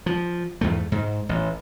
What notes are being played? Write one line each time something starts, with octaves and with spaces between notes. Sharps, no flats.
F3
E2 G#2 A3
G#2
A1